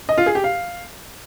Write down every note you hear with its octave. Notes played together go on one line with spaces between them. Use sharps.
D#5
F4
G#4
G4
F5